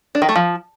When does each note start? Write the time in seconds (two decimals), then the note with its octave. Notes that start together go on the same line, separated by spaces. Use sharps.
0.15 D4
0.22 D#3
0.29 A3
0.36 F3